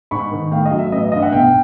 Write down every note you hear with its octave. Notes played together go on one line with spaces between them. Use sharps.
G#2 B5 C#6
D#3
A2 F5 G5
D#5 F5
F#3
E5
A1 D#5
E5
G2 D#5 F5
E5 F#5
B1 F5 G5